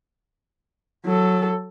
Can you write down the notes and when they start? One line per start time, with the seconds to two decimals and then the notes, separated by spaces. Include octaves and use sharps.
1.05 F#3 A4